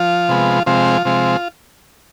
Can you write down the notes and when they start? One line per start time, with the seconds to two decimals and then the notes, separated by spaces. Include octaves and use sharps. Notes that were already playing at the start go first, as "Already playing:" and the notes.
Already playing: F3 F4
0.29 C3 G#3 B3
0.66 C3 F3 G#3 C4 F4
1.05 C3 F3 G#3 C4